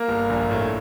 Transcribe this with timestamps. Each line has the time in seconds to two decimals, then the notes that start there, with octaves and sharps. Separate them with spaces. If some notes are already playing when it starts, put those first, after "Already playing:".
Already playing: A#3
0.08 G1
0.30 A#1
0.51 A2